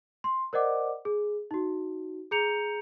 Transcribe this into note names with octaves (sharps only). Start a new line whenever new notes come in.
C6
A#4 C5 D5 D#5 F#5 D6
G#4
D#4 F#4
G#4 A#5 G6 C#7 F7